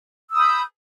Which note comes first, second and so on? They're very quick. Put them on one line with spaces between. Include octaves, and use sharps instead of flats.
E6 D#6 B5 G6